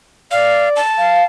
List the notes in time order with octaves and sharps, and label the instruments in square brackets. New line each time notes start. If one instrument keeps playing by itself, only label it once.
[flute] D5 [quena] F5
[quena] A5
[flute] F5